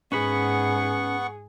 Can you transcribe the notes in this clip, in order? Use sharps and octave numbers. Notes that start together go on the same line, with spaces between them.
G#2 B3 C#4 G#4 B4 F#5 B5 C#6